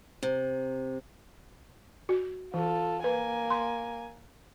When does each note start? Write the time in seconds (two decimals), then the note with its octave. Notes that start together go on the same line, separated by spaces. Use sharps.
0.23 C3
2.09 F#4
2.54 E3 F4 A4
3.04 A#3 B4 G#5
3.50 C6